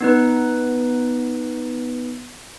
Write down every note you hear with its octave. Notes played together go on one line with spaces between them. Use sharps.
B3 D#4 B4